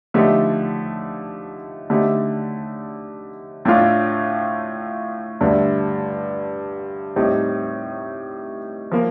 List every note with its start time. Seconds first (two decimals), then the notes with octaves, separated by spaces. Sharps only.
0.14 D3 F3 A3 D#4 G4
1.90 D3 A3 D#4 G4
3.65 A2 A3 D4 F4
5.41 G2 D3 A3
7.16 A2 G3 C4 D#4 G4
8.92 F3 A#3